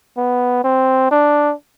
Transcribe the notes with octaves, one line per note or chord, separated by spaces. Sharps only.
B3
C4
D4